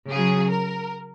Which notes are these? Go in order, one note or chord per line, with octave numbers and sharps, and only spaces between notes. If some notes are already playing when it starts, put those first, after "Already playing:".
C#3 F#3 G#4
A#4